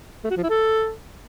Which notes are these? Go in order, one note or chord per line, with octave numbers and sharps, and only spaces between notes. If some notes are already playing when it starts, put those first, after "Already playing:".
A3
F#4
F3
E4
A4